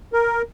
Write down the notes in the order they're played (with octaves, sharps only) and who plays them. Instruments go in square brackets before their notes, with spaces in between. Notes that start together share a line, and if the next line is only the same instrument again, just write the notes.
[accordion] A#4